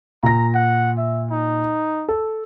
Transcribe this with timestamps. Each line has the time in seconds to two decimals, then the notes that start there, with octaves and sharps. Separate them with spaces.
0.23 A#2 A#5 A#6
0.55 F#5
0.98 E5
1.30 D#4
2.08 A4